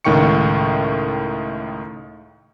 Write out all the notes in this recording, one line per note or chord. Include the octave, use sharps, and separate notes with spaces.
C#2 A2 D#3 G5 C#6 C#7